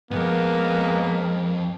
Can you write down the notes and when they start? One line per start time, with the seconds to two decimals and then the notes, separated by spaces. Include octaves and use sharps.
0.11 F2 G#2 G#3 A#3 B3 A#4